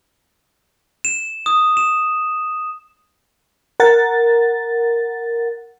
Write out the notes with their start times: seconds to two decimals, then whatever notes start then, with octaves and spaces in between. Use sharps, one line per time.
1.05 E7
1.46 D#6
1.77 E7
3.80 A#4 F#5 A6